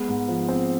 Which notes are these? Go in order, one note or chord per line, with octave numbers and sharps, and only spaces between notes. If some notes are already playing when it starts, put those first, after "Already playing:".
Already playing: G#3 B3
G#2
F3
C4